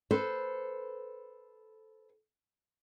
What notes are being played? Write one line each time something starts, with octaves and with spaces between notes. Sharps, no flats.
A4 B4 C5